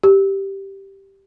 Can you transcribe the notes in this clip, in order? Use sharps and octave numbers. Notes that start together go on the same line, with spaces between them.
G4